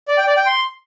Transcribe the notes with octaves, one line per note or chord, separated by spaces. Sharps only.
D5
G5
D5
G5
C6